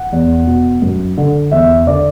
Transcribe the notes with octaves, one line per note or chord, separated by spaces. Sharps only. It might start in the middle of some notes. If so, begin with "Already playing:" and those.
Already playing: F#5
E2
B2
F#2
D3
E2 E5
D3 D5